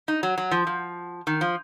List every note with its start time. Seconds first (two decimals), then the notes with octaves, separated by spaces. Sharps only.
0.08 D#4
0.23 F#3
0.38 F#3
0.51 F3
0.67 F3
1.27 D#3
1.41 F3